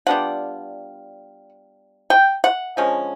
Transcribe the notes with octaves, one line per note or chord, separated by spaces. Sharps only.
G3 B3 D4 F4 F#5
G5
F#5
D3 F3 G#3 C#4